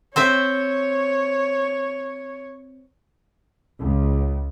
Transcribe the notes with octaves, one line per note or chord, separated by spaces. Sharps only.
C4 C5 C#5 E5
C#2